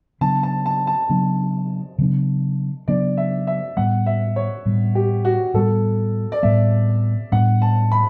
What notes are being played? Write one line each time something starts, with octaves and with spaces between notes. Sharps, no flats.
C#3 F#3 B3 D4 A5
A5
A5
A5
C#3 F#3 B3 D4
C#3 F#3 B3 D4
C#3 F#3 B3 D4 D5
E5
E5
A2 G3 B3 F#5
E5
C#5
A2 G3 B3
G4
F#4
A2 G3 B3 A4
D5
A2 G3 B3 E5
A2 G3 B3 D4 F#5
A5
B5